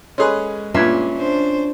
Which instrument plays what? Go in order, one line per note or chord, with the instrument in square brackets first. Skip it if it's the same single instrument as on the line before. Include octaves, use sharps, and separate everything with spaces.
[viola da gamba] G#3 [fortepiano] C#4 G#4 B4 [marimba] A4 D#5 C6
[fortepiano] G2 A#2 [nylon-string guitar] C#4 E5 [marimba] F4 G#6
[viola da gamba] D4 C5